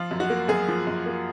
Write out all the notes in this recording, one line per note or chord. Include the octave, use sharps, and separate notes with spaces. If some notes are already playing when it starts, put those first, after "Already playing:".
Already playing: F3 F4
F#2
F#4
A#3
F#2 G#4
F3
F#2
A#3